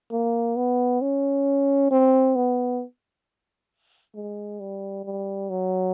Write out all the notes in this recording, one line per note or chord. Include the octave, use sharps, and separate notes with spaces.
A#3
B3
C#4
C4
B3
G#3
G3
G3
F#3